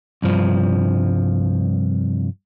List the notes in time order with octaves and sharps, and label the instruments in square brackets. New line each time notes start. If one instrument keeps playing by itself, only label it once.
[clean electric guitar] C2 G2 F3